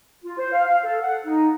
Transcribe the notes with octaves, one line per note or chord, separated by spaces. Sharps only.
F4
C5
F5
F5
A4
F#5
D#4